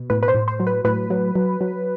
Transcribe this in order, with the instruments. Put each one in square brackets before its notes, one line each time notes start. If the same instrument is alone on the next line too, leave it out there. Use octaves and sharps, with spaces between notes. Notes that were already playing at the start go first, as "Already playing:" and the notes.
Already playing: [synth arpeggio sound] B2
A2 B4
B4
C5
A2
C5
F#3
B4
A2 B4
F#3
F#3
F#3